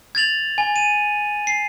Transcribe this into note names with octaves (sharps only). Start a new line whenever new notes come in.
G#6 A6 F7 F#7
G#5
D#7
C7